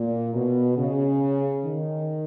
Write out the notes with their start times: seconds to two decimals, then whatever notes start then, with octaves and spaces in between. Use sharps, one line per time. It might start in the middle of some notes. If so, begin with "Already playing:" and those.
Already playing: A#2
0.34 B2
0.78 C#3
1.65 D#3